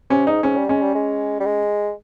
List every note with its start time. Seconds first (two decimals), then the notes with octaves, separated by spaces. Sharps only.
0.10 C3 C#4
0.27 G#2 D#4
0.43 G#2 C#4
0.57 G3
0.69 G#3 C#4
0.82 G3
0.95 G#3
1.40 G3
1.46 G#3